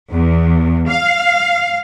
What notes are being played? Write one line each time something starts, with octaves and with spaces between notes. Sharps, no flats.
E2
F5